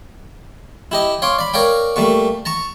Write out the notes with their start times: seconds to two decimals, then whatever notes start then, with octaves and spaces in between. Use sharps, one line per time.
0.91 E4 G4 D#5
1.22 C#5 F5 C6 D6
1.39 D5 B5
1.54 A#4 C#5 D5 F5 G5
1.96 G3 A3 A#3 C#6
2.45 A5 A#5 C#6